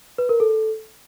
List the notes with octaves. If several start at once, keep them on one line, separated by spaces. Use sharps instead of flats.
B4
A#4
A4